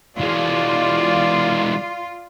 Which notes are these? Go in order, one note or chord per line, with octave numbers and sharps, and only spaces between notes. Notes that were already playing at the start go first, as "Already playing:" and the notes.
E3 G#3 F4 D5